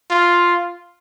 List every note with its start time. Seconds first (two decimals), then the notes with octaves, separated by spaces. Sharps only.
0.10 F4